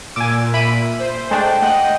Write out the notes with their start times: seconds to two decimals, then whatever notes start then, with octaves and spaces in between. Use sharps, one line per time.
0.16 A#2 G#5 D6 E6
0.54 E5 B5 D7 D#7
0.99 C5
1.31 G#3 A3 D4 G5
1.62 D#5 F#5